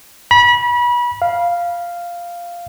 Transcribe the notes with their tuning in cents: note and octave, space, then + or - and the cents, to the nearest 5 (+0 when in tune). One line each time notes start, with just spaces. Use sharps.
B5 -30
F5 -5